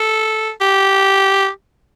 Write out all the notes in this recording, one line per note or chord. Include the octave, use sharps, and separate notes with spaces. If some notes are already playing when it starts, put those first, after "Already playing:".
Already playing: A4
G4